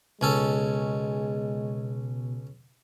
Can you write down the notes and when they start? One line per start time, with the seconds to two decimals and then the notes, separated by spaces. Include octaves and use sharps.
0.21 C#2 B2 G#3 C#4 A4